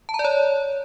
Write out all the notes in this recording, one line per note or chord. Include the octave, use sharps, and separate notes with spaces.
A5
A#5
D5
C#5